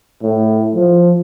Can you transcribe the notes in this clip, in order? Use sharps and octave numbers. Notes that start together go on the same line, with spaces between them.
A2
F3